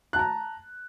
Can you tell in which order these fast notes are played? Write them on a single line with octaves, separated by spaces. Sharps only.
F#6 A5 A#5